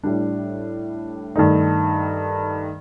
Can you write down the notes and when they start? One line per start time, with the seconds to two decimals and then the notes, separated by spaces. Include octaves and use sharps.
0.04 A2 G3 D4
1.36 G2 D#3 A3 D#4